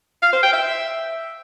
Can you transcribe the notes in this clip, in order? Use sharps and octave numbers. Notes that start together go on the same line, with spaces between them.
F5
C5
G5
E5